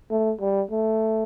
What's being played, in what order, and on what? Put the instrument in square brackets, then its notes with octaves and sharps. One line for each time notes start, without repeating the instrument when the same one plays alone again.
[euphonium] A3
G3
A3